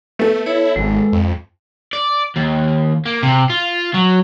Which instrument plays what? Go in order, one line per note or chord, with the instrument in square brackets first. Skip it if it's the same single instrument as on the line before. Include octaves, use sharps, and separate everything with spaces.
[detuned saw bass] A3 [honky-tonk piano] B3 A4
[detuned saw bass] E4 [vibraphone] C#5
[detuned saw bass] G#1 [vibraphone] G#3
[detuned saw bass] F2
[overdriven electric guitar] D5
D#2
A#3
C3
F4
F#3